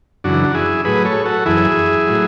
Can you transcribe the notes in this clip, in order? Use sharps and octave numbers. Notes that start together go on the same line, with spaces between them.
F#2 C#3 E3 D4 F#4
F#4
E4 G#4
A2 F#3 G#4 B4
A4 C#5
F#4 A4
F#2 E3 E4 G#4
A2 F#3